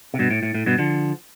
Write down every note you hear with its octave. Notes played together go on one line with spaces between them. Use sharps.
C3
G2 B2
A2
A2
A2
G2 B2
D3 F3